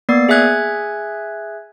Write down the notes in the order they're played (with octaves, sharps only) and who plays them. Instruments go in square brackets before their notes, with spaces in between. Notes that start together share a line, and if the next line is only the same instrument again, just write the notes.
[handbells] A#3 B3 D5 A6 C7
G#4 E5 G#5 F#6 G#6